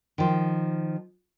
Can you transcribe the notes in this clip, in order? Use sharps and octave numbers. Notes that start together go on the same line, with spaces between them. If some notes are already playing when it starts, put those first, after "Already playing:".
D#3 F3